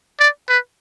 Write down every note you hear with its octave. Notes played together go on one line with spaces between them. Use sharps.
D5
B4